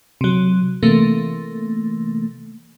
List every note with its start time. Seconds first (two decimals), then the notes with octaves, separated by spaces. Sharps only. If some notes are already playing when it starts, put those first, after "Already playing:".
0.21 C3 F#3
0.83 C3 E3 A3 A#3